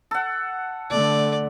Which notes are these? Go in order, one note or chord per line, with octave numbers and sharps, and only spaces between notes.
A4 F#5
D3 A3 D5